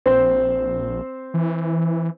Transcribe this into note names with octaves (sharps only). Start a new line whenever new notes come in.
A#1 C4 C5
E3